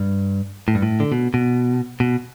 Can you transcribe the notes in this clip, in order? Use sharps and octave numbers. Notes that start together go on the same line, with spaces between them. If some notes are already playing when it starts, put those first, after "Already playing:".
Already playing: G2
A2
G2
A2
D3
B2
B2
B2